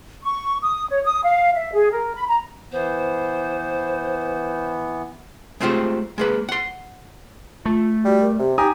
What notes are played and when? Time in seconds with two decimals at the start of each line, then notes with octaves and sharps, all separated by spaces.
0.24 C#6
0.62 D#6
0.90 C#5
1.05 D#6
1.23 F5
1.54 E5
1.73 G#4
1.92 A#4
2.15 B5
2.27 A#5
2.72 E3 B3 C5
5.60 G#3 A3 C4 F4 G4 C5
6.18 G#3 A#3 B4
6.49 F#5 C6
7.66 A3 F4
8.04 G3 F#4
8.21 A#4
8.39 C3 G4
8.58 D#4 G4 G#5 A#5 D#6